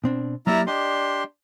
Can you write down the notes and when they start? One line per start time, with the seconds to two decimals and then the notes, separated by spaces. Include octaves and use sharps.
0.04 B2 C4 D4
0.47 F#3 A#3 E4 G4 D5 E5 A#5 F6
0.67 D4 G4 D5 D#5 C6